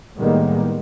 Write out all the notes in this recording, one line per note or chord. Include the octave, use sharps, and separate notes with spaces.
A2 D#3 G3 G#3 A#3 B3